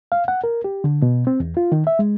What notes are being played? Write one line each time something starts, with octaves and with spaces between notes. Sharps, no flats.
F5
F#5
A#4
G4
D3
B2
C4
E2
F4
D#3
E5
G#3